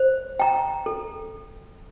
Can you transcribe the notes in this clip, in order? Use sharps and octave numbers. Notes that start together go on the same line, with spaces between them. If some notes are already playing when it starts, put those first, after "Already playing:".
Already playing: C5
G5 A#5
A4